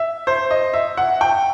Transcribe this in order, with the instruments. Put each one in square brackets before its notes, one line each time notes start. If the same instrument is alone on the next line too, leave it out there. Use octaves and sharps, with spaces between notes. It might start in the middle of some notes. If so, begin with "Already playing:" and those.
Already playing: [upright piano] E5
C5
D#5
E5
F#5
G5